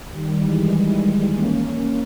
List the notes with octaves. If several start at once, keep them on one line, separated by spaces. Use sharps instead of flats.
D#3 G3
E3 G#3
A#3 C#4